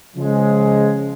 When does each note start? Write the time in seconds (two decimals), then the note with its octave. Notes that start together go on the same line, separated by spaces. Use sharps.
0.15 C#3 F3 G#3